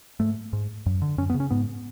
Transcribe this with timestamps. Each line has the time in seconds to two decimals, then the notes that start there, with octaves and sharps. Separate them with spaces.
0.20 G#2 A3
0.53 G#2
0.86 F#2
1.02 D3
1.18 F#2 C#4
1.30 B3
1.34 C#3
1.40 C#4
1.50 G#2 B3